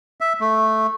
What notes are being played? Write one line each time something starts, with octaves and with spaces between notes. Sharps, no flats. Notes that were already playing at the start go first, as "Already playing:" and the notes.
E5
A3